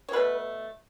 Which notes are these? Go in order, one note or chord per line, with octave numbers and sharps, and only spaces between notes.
C#5
B2 F#3 A3 B4